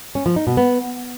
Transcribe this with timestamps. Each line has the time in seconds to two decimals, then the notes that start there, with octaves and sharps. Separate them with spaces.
0.15 C#4
0.26 F3
0.36 D#4
0.47 B2
0.57 B3